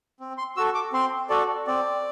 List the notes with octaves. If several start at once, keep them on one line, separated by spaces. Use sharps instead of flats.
C4
C6
F#4 A4 E6
D6
C4 C6
F#4 A4 D5
C4 D5